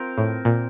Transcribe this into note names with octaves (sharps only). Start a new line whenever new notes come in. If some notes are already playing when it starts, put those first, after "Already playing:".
Already playing: C4 F4 A#4
A2
A#2